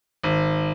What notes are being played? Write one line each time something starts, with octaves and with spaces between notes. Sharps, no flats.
G#1